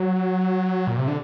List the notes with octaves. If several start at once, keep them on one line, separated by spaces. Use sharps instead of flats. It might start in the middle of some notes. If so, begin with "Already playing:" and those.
Already playing: F#3
A#2
C3
D3